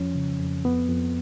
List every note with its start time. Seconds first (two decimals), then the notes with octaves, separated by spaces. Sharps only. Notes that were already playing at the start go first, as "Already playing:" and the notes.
Already playing: F2 F3 C#4
0.15 C#3
0.39 F2
0.65 F2 B3
0.89 F2